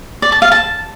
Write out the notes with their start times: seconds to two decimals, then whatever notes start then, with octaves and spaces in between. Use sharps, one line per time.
0.22 D5
0.32 A5
0.42 F5
0.52 A5